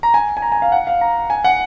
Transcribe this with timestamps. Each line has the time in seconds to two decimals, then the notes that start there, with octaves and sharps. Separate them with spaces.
0.03 A#5
0.14 G#5
0.37 G#5
0.42 A#5
0.52 G#5
0.62 F5
0.72 F#5
0.87 F5
1.01 A#5
1.30 G#5
1.44 F#5